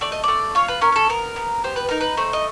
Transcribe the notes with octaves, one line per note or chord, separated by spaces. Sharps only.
A3 D5
D#5
A3 D5
F4 C#5
B4
C#4 A#4
A#4
A4
B3 A#4
B3
G4 C5
B4
D#4 A#4
B4
A3 C5
D#5